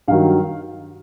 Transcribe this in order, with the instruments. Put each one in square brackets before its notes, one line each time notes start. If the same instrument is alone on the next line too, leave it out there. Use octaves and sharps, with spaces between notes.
[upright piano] G2 D#3 F#3 F5